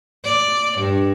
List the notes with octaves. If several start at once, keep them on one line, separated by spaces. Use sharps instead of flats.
D5
G2